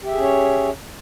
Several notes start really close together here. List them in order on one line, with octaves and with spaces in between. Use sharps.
G4 E5 G#4 C#4 C#5